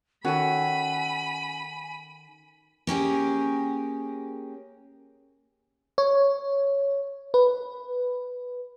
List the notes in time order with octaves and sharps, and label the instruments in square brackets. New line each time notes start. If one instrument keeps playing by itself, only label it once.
[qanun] D#3 A4 [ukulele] C#4 F#4 [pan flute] G#5 [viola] B5
[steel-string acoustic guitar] A#3 C#4 G4 G#4
[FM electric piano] C#5
B4